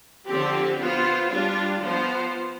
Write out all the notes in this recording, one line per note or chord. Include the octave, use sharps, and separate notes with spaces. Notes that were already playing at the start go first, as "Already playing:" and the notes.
D3 F3 C4 G4
B3 F4 C5
G3 D4 F4
F3 B3 F4 C5